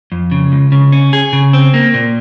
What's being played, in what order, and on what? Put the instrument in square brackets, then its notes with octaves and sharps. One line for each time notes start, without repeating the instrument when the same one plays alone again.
[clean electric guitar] F2
C#3
C#2
C#3
C#4
G#4
C#3
C4
A#3
A#2